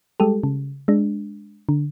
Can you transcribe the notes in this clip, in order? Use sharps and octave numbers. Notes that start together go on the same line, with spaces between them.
G3 G#3 G4 A4
C#3
G#3 D4
D3